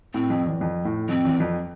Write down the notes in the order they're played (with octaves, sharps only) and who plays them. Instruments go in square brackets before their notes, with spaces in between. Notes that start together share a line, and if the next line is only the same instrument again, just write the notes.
[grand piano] A2 [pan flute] C4
[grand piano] F2
E2
F2
A2
[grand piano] F2 [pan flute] C4
[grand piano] E2
F2